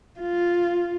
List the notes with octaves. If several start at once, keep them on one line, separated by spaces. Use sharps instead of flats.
F4